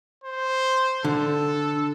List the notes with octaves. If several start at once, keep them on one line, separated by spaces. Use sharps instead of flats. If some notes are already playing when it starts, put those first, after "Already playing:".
C5
D3 A4